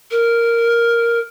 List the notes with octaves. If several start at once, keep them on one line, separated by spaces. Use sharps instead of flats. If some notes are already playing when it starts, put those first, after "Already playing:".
A#4